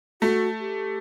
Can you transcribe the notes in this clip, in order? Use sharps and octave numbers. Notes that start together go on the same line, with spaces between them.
A3 F#4
G4